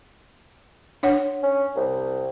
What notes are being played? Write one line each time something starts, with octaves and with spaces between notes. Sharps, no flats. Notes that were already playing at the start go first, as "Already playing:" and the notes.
D4 C#5 F#5
C#4
C2